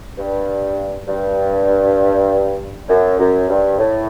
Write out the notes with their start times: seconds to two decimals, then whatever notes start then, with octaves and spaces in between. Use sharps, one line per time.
0.18 G2
1.08 G2
2.89 F#2
3.19 F#2
3.49 G2
3.78 A2